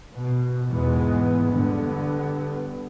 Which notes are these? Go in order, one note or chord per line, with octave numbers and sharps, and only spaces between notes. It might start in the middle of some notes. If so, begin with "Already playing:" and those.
B2
E2 G#2 B2 E3 G#3 B3
G2 D3 B3